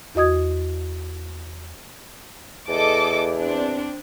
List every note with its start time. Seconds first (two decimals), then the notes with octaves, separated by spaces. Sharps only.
0.15 E2 F#4 D#5 D#6 G#6
2.69 E2 A4 D#5 D6
3.38 C4 D4